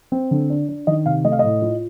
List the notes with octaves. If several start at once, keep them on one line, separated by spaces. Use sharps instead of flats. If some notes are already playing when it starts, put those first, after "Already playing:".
C4
D3
D4
D4
D#3 D#5
C3 F5
A3 D#5
F5
A2 D#5
F4